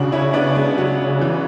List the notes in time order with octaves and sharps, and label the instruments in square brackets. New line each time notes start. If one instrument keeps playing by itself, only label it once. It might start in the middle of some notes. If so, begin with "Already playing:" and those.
Already playing: [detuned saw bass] C#3 [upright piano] D4 F#4
[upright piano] C#4 E4
B3 D4
G#3 B3
F#3
E3 G#3